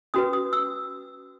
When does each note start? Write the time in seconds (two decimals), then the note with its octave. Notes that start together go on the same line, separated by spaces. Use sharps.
0.14 C#4 F#4 B4 D#6
0.33 D#6
0.53 E6